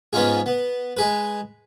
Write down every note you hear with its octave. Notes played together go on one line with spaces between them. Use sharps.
G#2 B3 C#4 D#4 F4 G#4
B3
G#3 G#4 B4